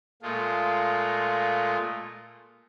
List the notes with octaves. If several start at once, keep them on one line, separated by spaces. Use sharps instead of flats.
A#2 G#3 A3 F4